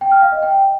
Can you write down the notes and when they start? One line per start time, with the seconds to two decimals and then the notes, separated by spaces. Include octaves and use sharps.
0.01 G5
0.11 F6
0.22 F5
0.32 D#5
0.42 G5